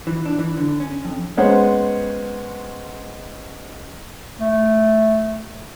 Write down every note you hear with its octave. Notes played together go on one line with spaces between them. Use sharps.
E3
D4
E3
D3
C#4
F2
G#3 B3 C#4 C5 C#5 F#5
A3